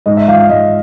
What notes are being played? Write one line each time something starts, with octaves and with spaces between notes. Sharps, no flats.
G#2 D#5
E5
F3 F5
F5
G#2 D#5